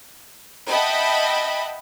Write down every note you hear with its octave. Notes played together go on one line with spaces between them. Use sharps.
D#5 E5 F#5 G5 A5 B5